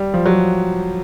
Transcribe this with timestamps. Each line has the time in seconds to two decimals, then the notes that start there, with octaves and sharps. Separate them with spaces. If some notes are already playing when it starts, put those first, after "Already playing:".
Already playing: G3
0.14 F3
0.26 F#3